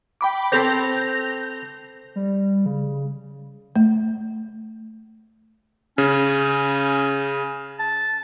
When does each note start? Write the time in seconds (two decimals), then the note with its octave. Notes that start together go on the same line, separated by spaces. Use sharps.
0.21 G5 B5 D6
0.52 C4 A4 B5 G6 A#6 F7
2.16 G3
2.66 C#3
3.76 A3
5.98 C#3 C#4
7.79 A5